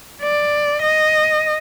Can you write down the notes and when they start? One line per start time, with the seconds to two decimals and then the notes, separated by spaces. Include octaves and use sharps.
0.22 D5
0.83 D#5